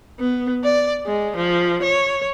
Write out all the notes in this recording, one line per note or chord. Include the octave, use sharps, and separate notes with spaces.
B3
D5
G#3
F3
C#5